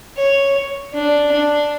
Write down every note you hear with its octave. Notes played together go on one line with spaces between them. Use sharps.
C#5
D4
D4